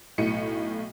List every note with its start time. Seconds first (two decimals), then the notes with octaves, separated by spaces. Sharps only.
0.18 B1 A2 C#7 D#7